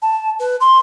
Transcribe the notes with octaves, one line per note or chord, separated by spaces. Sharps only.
A5
B4
C6